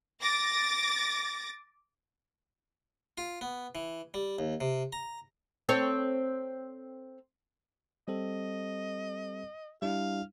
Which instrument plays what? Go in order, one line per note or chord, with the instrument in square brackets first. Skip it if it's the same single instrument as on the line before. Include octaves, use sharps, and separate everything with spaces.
[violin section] D6 A6 A#6
[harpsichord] F4
B3
E3
G3
D#2
C3
A#5
[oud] C4 A4 C#5
[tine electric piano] G3 C4 A4 [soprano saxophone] D#5
[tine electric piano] G3 D4 E4 [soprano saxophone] F5